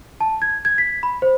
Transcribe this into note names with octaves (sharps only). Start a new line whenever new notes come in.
A5
G#6
G#6
B6
B5
C5